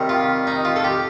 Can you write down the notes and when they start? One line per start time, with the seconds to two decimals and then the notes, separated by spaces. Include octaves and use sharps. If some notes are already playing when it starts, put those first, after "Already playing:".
Already playing: C3 D#3 G3
0.09 F4
0.47 D#4
0.65 F4
0.76 A4
0.84 G4